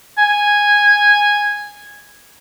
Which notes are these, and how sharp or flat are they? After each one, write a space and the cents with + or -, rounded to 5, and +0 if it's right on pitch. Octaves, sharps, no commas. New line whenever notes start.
G#5 -10